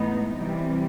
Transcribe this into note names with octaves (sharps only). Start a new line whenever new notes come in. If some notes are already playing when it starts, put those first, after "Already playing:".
Already playing: A2 E3 G#3 B3 D#4
C3 E3 G3